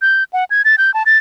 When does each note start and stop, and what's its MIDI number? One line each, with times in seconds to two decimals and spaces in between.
0.02 0.24 91
0.33 0.44 78
0.51 0.62 92
0.65 0.76 93
0.78 0.93 91
0.94 1.03 81
1.06 1.18 93